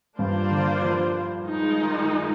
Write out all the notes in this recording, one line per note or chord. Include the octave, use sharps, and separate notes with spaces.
G2 A#3 D4 F4 C5
D3
F3
D#3 G#3 D#4